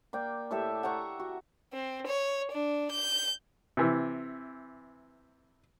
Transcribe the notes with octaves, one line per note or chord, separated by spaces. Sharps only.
A#3 D5 G5
A2 G4 A4 E5
F#5 G5 A#5 C#6
F#4
C4
C#5
D4
G6
C3 E3